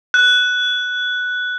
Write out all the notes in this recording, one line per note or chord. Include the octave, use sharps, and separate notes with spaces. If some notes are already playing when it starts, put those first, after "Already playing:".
F#6